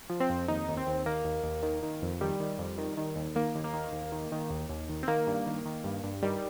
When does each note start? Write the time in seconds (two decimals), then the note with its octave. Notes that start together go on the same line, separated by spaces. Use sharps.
0.10 F3
0.20 C4
0.30 F2
0.48 D#2 D#4
0.68 D#2
0.77 C4
0.87 D#2
1.06 D#3 A#3
1.24 D#2
1.44 D#2
1.63 D#3
1.83 D#3
2.02 F2
2.21 D#3 G3
2.40 D#3
2.58 F2
2.78 D#3
2.97 D#3
3.16 D#2
3.36 D#3 A#3
3.55 D#2
3.64 A#3
3.73 D#3
3.92 D#2
4.12 D#3
4.32 D#3
4.50 D#2
4.69 D#2
4.89 D#3
5.03 C4
5.08 D#3 A#3
5.27 G2
5.47 D#3
5.66 D#3
5.84 G2
6.04 G2
6.23 D#3 G3